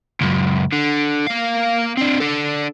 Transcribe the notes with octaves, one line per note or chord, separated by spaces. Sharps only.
C#2 F#2
D3
A#3 F5
C4 D4
D4 A4